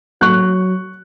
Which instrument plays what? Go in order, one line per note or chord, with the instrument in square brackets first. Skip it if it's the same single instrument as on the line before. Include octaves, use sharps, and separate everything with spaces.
[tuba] F#3 [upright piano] C#6 F#6